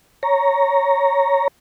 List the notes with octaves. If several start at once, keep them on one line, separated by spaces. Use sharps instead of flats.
C#5 A#5